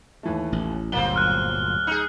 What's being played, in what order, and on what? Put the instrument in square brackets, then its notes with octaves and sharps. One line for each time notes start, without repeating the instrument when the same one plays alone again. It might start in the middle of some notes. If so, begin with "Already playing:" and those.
[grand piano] D#2 E3 A3
[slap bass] A1
[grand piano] D1 [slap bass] G1 A#2 F#3 [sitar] A#3 C4 [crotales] G7
[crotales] F6 F#6
[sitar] D#4 G#4